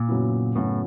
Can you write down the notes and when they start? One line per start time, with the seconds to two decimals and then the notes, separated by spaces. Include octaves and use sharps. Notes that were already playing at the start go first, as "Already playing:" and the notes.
Already playing: A#2
0.08 F#2 C#3 F#3 B3 E4
0.55 F#2 A2 C#3 F#3 B3 E4